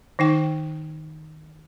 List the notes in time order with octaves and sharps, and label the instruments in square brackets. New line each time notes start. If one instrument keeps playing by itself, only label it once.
[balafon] D#3 D#4 G5